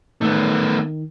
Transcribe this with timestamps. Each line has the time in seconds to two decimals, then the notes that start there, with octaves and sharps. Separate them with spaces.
0.21 D#3 A3 B3